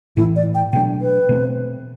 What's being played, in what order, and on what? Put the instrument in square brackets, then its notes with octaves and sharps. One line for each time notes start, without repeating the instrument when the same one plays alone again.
[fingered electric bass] A2 E3 A3 [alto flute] E4
[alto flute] D5
G5
[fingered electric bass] B2 F#3 A3 D4 [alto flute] G5
[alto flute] B4
[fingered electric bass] B2 A3 C4